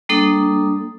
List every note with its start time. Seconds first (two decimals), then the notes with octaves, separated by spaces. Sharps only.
0.09 G3 A#3 D4 A4 D#6